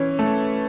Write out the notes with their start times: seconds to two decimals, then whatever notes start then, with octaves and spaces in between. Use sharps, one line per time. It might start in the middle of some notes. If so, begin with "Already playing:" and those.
Already playing: E3 C#4
0.19 A3